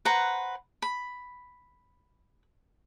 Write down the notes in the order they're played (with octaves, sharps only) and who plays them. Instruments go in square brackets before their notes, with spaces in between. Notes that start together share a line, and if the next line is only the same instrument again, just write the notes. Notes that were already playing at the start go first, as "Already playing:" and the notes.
[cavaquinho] B4 C5 F#5 A#5
B5